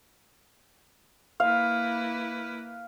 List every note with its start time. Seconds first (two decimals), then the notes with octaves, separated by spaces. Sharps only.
1.40 A#3 E4 B4 F5